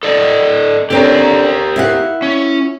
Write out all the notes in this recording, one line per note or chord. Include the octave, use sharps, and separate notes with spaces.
A4 D5 D#5
D3 C4 C#4 G4 A#4
E4 F5 F#5
C#4